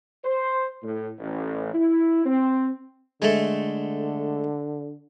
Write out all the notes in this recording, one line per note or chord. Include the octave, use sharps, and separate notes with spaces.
C5
A2
A1
E4
C4
D3 G#3 A3